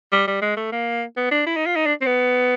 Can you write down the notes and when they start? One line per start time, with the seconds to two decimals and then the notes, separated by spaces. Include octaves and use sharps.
0.12 G3
0.27 G3
0.42 G#3
0.57 A3
0.72 A#3
1.17 B3
1.31 D4
1.46 E4
1.56 D#4
1.66 F4
1.76 D#4
1.86 D4
2.01 C4
2.06 B3